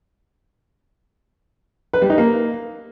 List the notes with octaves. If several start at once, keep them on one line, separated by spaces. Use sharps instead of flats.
B4
G3
D#4
A#3